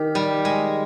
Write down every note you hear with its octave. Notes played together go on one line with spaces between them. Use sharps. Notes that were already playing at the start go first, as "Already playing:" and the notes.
Already playing: D#3 G4
G3
G#3